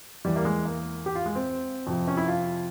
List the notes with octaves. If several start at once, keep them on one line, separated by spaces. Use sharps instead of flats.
E2 E3 G3
A#3
G#3
A#3
G4
F4
G#3
C4
F2 C3 F3
C#4
E4
F4